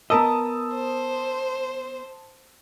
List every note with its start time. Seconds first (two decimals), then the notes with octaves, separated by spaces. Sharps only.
0.10 B3 A#4 D#5 A5 D#6 E6
0.74 C5